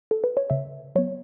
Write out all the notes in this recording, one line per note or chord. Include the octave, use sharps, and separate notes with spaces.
A4
B4
C#5
C#3 E5
F#3 B3 C#5